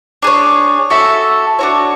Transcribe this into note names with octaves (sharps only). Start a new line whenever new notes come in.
D4 G#4 C#5
F#4 A4 E5
D4 F#4 C#5